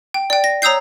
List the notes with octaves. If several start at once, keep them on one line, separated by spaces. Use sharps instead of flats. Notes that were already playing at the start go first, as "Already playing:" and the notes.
G5
D5 G5
A#6
C#5 A#5 D#6 E6 G6 C7